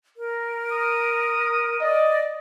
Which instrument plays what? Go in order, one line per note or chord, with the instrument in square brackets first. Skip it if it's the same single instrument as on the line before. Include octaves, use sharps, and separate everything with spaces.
[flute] A#4
[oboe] D#6
[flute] D5 [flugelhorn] D#5